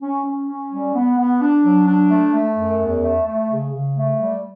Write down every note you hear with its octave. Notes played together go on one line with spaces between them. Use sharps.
C#4
C#4
C#4
G3
B3
B3
D4
F#3
D4
A3
A3
F#2
E2
A3
A3
C#3
C#3
A3
G3